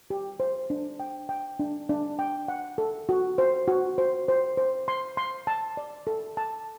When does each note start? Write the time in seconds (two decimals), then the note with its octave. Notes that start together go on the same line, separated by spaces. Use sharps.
0.10 G4
0.40 C5
0.70 D4
1.00 G5
1.29 G5
1.59 D4
1.89 D4
2.19 G5
2.48 F#5
2.78 A4
3.09 F#4
3.38 C5
3.68 F#4
3.98 C5
4.28 C5
4.57 C5
4.88 C6
5.17 C6
5.47 A5
5.77 D5
6.07 A4
6.37 A5